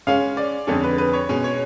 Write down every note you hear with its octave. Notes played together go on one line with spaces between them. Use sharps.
C#3 G#3 C#4 F5
D5
F2 D3 G#3 C#4 A4
B4
B4
C#5
B2 G#3 C#4
C#5